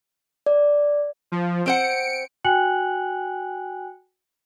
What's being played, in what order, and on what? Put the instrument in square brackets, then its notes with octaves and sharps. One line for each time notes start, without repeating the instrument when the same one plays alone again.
[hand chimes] D5
[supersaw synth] F3
[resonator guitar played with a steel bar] C4 C5 F#5 [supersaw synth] C#7 D7
[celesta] F#4 G5 G#5 F#6 C#7 F#7